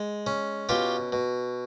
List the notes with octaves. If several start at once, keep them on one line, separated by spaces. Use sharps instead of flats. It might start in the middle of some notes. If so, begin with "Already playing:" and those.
Already playing: G#3
C#4
B2 F4 G4
B2